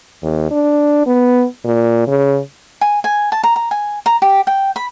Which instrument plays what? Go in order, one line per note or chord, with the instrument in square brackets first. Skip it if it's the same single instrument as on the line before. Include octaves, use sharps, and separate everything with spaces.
[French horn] D#2
D4
B3
A#2
C#3
[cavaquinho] G#5
G#5
A5
A#5
A#5
G#5
A#5
G4
G5
B5